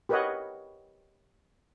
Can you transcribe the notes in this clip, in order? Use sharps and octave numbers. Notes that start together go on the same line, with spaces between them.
G4 A#4 B4 C#5 D#5 F#5